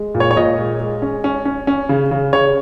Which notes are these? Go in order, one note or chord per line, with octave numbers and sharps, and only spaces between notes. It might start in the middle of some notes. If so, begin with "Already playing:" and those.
Already playing: G#3
A#2
C#5
C#5
A#2 D#5
G#3
G#3
C#4
C#4
C#4
C#4
C#3
C#3
C#3 C#5